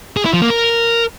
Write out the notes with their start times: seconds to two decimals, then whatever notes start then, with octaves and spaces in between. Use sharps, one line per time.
0.17 G#4
0.25 E4
0.33 F3
0.42 A#3
0.50 A#4